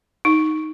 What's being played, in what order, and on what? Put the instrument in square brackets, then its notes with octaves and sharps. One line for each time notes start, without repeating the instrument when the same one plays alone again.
[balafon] D#4